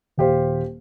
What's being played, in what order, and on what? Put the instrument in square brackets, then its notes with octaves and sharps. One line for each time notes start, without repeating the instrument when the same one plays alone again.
[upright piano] D#1 G4 C5 F5